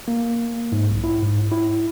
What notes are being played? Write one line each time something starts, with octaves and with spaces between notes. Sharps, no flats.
A#3
G#2
B1
E4
G#2
E4